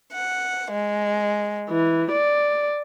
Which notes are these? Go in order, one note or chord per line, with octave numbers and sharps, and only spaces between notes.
F#5
G#3
E3
D5